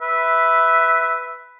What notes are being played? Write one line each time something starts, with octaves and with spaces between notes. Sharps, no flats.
B4 E5